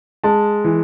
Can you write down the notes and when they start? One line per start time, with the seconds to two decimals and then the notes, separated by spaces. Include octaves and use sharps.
0.24 G#3 A5
0.64 E3